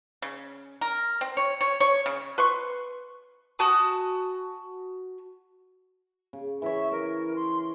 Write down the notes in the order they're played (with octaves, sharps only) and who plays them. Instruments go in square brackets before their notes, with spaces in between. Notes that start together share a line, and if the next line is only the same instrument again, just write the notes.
[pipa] C#3
A#4
C4
C#5
C#5
C#5
C#3
B4 C6 C#6
[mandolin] F#4 G#5 A5 D#6
[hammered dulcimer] C#3
[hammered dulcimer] E3 C#5 [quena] E5
[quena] A#4 [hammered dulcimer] C#5
[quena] C6